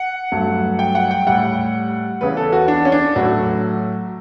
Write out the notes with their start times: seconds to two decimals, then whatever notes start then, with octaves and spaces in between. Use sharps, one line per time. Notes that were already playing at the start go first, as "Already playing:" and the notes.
Already playing: F#5
0.32 G2 F#3 A3
0.79 G5
0.95 F#5
1.11 G5
1.26 A2 G3 F#5
2.21 E2 C#3 E3 B4
2.37 A4
2.52 F#4
2.68 D4
2.85 C#4
2.92 D4
3.16 A2 F#3 A3 F#4